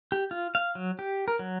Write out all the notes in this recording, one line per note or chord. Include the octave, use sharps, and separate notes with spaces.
G4
F4
F5
F#3
G4
A#4
F#3